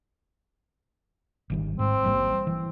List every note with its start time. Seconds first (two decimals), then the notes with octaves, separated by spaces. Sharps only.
1.50 G#1 D#3 G3
1.79 G#2 C4
2.04 A1 G3 A#3
2.47 E3